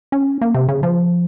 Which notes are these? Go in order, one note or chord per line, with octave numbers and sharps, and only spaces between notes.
C#4
A#3
C3
C#3
F3